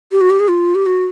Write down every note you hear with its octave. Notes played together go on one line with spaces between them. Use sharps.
G4
F#4
G4
G#4
F4
G4
F#4